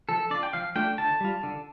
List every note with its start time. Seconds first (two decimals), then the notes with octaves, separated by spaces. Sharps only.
0.09 F3 A4
0.30 D4 F4 D5
0.43 G5
0.53 F3 F5
0.76 A3 D4 F4 G5
0.98 D3 A5
1.21 G3 F4
1.43 D3